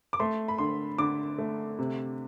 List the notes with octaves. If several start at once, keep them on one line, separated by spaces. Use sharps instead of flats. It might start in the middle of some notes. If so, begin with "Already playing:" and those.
D6
A3 C6
B5
D3 C6
D3 D6
A3
C3